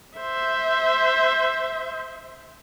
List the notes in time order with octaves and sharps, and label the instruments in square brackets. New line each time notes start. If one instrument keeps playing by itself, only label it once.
[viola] C5 E5